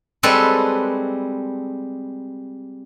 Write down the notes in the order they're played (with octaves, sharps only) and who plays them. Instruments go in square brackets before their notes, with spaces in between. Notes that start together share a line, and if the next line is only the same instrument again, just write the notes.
[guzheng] G3 G#3 C4 A4 B4 C#5